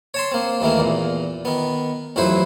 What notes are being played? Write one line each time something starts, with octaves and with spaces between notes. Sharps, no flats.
C#5 A5 C6
A#3 C4
D#2 D#3 E3 A3 A#3
E2 A#2
D#3 B3
A1 F2 F#3 E4 B4 C5